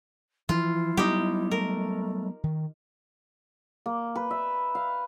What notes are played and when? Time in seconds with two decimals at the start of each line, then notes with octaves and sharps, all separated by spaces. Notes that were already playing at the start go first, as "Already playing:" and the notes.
0.49 E3 F3 E4 F4
0.97 F#3 G3 B3 D#4 G4
1.51 A3 A#4
2.44 D#3
3.86 A#3
4.16 B4
4.31 E5
4.75 F5